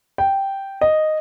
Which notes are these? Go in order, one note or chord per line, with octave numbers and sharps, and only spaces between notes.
G5
D#5